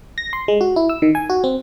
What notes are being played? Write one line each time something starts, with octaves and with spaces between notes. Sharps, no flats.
A#6
C6
G#3
F#4
E4
E6
D#3
G#5
F#4
C4